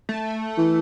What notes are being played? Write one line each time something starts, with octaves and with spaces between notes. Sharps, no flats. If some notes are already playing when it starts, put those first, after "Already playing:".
A3
E3